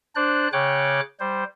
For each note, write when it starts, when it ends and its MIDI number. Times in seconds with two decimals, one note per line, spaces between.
0.16 0.48 62
0.16 0.48 72
0.16 0.48 74
0.16 0.48 90
0.53 1.01 49
0.53 1.01 73
0.53 1.01 79
0.53 1.01 86
0.53 1.01 90
1.20 1.44 55
1.20 1.44 72